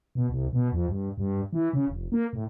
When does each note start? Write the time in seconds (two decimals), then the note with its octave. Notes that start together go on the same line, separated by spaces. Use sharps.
0.15 B2
0.30 C2
0.53 B2
0.73 F2
0.88 G2
1.18 G2
1.53 E3
1.73 C#3
1.88 F1
2.12 A#3
2.33 A2